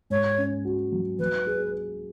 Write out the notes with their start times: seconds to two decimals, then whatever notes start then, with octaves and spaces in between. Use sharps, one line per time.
0.10 G#2 C#5
0.38 C#4
0.65 F#4
0.92 F#3
1.19 F#3 B4
1.47 G#4